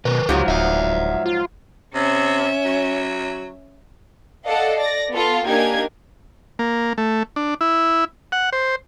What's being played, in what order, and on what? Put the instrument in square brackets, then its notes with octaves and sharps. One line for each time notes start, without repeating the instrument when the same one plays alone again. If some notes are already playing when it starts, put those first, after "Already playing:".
[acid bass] B2 [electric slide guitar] D#3 A#4 B4
[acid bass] C#2 [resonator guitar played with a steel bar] G#2 F3 F#3 [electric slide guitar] D#4 G4
[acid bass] D1 [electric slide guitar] E5 F#5
[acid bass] F4
[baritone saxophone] C3 [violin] C#4 E5
[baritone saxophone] F#3
[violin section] A4 D5 D#5 F5 F#5
D5 A#6
B3 F4 A4
A#3 D4 D#4 G4 G#5 G#6
[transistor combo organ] A#3
A3
D4
E4
F#5
C5